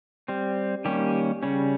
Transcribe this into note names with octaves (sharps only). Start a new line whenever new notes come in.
G3 C4
D#3 G3 A#3 C#4 G4
C#3 G3 C#4